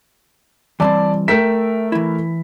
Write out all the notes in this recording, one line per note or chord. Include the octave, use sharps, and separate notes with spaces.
E3 G3 C4 D5 A5
A3 A#4 E5 G5 B6
E3 E4